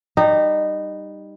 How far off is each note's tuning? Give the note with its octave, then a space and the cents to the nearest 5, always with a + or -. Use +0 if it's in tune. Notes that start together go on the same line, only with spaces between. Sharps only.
G3 +0 D#4 -20